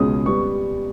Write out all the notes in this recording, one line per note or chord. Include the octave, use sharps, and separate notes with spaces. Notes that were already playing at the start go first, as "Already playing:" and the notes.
Already playing: C#2 B2 G#3 C#4 D#6
G3 B3 C#6